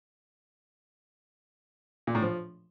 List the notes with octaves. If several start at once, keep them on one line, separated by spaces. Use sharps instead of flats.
A#2
A2
F3